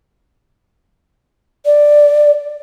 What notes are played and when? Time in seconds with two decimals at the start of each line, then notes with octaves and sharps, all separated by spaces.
1.65 D5